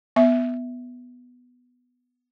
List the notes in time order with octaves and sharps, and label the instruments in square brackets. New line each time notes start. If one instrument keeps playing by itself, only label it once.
[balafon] B3 E5